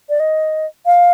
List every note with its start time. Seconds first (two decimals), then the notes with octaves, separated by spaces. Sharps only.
0.09 D5
0.20 D#5
0.86 F5